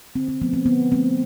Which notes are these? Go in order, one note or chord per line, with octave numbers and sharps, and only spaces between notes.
D3 C4
C4
F3 A3 B3
C4
D3 B3
F3 A3 C4